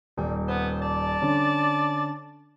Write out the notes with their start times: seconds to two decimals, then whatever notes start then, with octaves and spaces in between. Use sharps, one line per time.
0.18 D#1 G3
0.48 B3 C5
0.82 D5 A5
1.21 D3 C#4